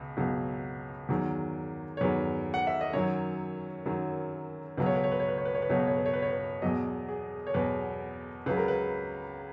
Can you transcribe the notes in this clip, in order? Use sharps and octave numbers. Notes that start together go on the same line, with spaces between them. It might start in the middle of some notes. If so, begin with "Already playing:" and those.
Already playing: C#2 B2
C#2 B2 F#3
E2 D#3 F#3
C#5
E2 D#3 F#3 B4
F#5
E5
D#5
F#2 D#3 F#3 C#5
F#2 D#3 F#3
C#2 B2 F#3 B4
C#5
B4
C#5
B4
C#5
B4
C#5
B4
C#5
B4
C#2 B2 F#3 C#5
B4
C#5
B4
C#5
B4
C#5
B4
E2 B2 F#3 D#5
G#4
C#5
E2 B2 F#3 B4
C#2 C#3 F#3 B4
A#4
B4